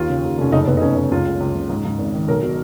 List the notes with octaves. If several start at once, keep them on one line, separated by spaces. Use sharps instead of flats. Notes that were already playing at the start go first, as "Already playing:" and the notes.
Already playing: D#2 F4
C#3
D#2
F1 C#4
F#1 D#4
F#1 B3
D#4
F#1 C#4
F#1 D#4
C#2 F4
C#2
C#2
C#3
G#2
G#2
G#1
D#3
B1 A#4
B2